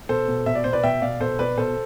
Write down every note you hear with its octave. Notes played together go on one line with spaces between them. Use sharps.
B2 A4 C5
B2
B2 E5
D5
B2 C5
B4 D5
B2 E5 G5
B2 D5 F5
B2 A4 C5
B2 B4 D5
B2 A4 C5